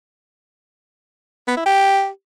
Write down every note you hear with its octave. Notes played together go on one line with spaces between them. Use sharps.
B3
E4
G4